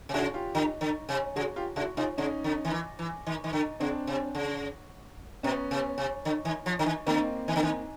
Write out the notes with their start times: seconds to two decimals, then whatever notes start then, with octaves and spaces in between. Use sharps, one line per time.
0.09 C3
0.13 C#3 E4 F#4
0.34 F4 G4
0.55 D3
0.81 D3
1.09 C3
1.36 C#3 F#4 G#4
1.56 F4 G4
1.76 C#3 E4 F#4
1.97 C3 D#4 F4
2.17 C#3 C#4 D#4
2.44 D3
2.65 D#3
2.71 E3
2.99 E3
3.27 D#3
3.44 D#3
3.53 D3
3.80 C#3 C4 D4
4.07 C3
4.35 C#3
5.43 B2 B3 C#4
5.71 C3
5.98 C3
6.25 D3
6.45 D#3
6.66 F3
6.79 D3
6.86 D#3
7.06 D3 A#3 C4
7.48 D#3
7.56 D3
7.63 D#3